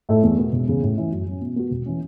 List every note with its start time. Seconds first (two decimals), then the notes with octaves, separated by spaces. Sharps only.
0.09 A2 A3 E4 A4
0.23 E2
0.38 B2 B3
0.53 E1
0.68 E2 C#3
0.83 A2
0.98 E3 C#4 E4
1.12 F#2
1.27 F#3 C#4
1.41 B2
1.56 B3 F#4
1.71 E1
1.86 E3 C#4